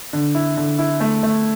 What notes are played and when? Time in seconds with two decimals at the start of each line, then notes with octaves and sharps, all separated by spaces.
0.13 D3
0.35 E4
0.57 D3
0.79 E4
1.00 A3
1.23 A3